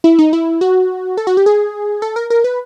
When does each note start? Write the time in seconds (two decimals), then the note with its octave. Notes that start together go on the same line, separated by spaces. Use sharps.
0.04 E4
0.19 D#4
0.33 E4
0.61 F#4
1.17 A4
1.27 F#4
1.37 G4
1.46 G#4
2.02 A4
2.16 A#4
2.30 A#4
2.44 B4